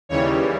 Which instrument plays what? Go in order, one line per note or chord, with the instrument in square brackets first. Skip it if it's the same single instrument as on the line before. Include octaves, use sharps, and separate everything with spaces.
[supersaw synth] D#2 C#3 E3 G3 C#5